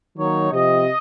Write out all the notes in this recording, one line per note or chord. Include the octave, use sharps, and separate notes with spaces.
D#3 F#3 A#3 D#4 C#5
C3 F3 C4 D#5